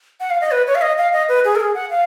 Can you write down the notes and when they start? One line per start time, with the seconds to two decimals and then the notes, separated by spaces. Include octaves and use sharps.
0.20 F#5
0.30 F5
0.41 D#5
0.51 B4
0.67 C#5
0.75 F5
0.82 D#5
0.98 F5
1.13 D#5
1.29 B4
1.45 G#4
1.56 A#4
1.60 G#4
1.75 F#5
1.90 F5